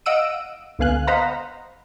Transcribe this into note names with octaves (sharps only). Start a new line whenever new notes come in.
D#5 F5 F#5 E6 D7 D#7
C#2 D3 B3 F5 G#5 F#6
C5 D#5 F5 F#5 A#5 B5